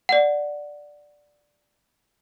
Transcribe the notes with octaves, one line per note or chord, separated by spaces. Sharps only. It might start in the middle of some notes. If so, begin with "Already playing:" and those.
D5 F#5